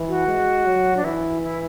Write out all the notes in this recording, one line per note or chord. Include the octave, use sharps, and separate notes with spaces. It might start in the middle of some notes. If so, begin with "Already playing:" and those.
Already playing: E3
F#4
G#3
F#3
D4
E3 E4
E4